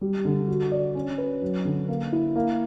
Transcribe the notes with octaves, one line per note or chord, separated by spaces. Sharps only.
G3
D3
F#4
D5
C#4
B4
F#3
D3
A#3
E4
A#3